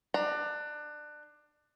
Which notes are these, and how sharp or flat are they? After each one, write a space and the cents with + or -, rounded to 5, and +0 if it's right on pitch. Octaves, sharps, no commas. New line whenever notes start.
D4 +25 A#5 +0